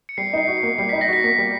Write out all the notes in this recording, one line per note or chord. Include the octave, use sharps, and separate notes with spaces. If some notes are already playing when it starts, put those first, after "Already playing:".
C#7
G3 C7
D#4 C7
F#4
A#3 C7
G3 C7
D#4 B6
A#6
F#4
B6
A#3
G3